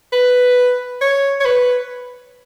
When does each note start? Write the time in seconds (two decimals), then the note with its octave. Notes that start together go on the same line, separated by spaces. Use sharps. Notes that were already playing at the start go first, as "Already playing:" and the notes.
0.13 B4
1.02 C#5
1.40 C#5
1.45 B4